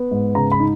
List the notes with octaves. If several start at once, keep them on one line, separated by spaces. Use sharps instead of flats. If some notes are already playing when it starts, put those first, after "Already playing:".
Already playing: B3
G#2
C#3 A#5
B5
D#4